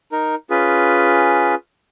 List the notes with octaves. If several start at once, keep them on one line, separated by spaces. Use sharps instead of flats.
D#4 A#4
C#4 F4 G#4 B4